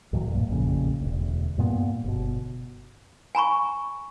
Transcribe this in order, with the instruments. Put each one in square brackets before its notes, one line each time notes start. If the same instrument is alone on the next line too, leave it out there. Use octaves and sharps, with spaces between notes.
[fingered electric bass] D2 A2 E3 F#3
B1 G2 A#2
A1 F2 A#2 C#3
E1 D2
G2 A#2 E3 B3
G1 B2
[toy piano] G#5 A#5 B5 C#6